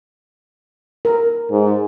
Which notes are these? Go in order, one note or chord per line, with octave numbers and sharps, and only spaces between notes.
A#4
G#2